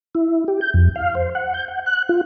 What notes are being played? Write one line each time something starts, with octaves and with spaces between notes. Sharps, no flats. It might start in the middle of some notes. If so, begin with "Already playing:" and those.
E4
G4
G6
F2
F5
C5
F#5
G6
F#5
F#6
F4